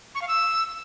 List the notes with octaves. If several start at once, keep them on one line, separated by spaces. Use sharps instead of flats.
C#6
F5
E6